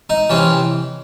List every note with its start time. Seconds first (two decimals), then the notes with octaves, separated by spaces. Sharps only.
0.10 D#4
0.30 C3 E3 C#4